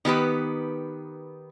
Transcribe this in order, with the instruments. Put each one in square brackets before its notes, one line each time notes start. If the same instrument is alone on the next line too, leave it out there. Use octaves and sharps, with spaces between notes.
[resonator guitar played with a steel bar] D#3 B3 G4 B4